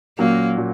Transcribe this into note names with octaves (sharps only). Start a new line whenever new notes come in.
A#2 F#3 A#3 C#4 F#4
A#2 F#3